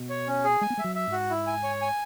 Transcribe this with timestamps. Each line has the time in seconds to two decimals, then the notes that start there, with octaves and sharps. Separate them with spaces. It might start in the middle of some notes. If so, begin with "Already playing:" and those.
Already playing: B2
0.09 C#5
0.27 C#4
0.44 G#4
0.61 G#3 G#5
0.70 B3
0.77 G#3 E5
0.84 F#3
0.95 E5
1.07 G#2 F#4
1.30 E4
1.47 G#5
1.63 C#5
1.82 G#5